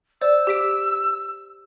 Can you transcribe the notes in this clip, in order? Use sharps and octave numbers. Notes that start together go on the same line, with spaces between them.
C5 D5 E6
G4 B6 D7